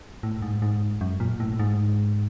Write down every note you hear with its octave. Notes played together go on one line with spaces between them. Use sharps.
A2
G#2
G#2
F#2
A#2
A2
G#2